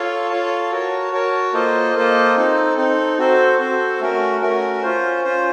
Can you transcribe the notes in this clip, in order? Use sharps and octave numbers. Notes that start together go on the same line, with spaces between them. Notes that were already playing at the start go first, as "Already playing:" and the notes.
Already playing: F4 A4 C#5 F5 A5
F4 A4 C#5 F5 A5
F#4 A#4 C#5 A5
F#4 A#4 C#5 A5
A#3 F4 A4 C5 D#5
A#3 F4 A4 C5 D#5
C4 D#4 A4
C4 D#4 A4
C4 F#4 A4 C5
C4 F#4 A4 C5
A3 C#4 F#4 A#4
A3 C#4 F#4 A#4
C#4 F4 C5
C#4 F4 C5